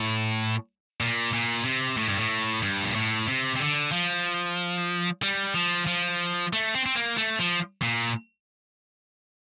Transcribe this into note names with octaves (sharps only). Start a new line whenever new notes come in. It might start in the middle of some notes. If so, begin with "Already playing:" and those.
Already playing: A2
A#2
A#2
C3
A2
G2
A2
G2
A#2
A2
C3
C3
D3
F3
G3
F3
F3
A3
C4
C4
A#3
A3
F3
A#2